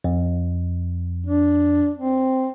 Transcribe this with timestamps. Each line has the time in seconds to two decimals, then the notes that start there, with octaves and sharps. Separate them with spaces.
0.04 F2
1.26 D4
1.98 C4